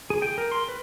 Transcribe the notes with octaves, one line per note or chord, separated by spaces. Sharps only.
G#4
G5
A#4
C6
B4